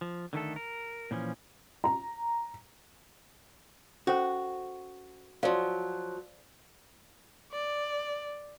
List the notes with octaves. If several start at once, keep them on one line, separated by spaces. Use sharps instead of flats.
F3
D3 D#3 A3 A4
A#4
A#2 E3 F3 C#4
A#5
C#4 F#4 A4 C5
F3 F#3 C5 D5 F5
D5